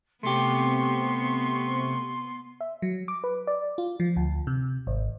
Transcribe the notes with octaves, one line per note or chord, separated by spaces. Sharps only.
C3 A3 B3 G4 C6 C#6
E5
F#3
D6
B4
D5
F4
F3
D2
C3
G#1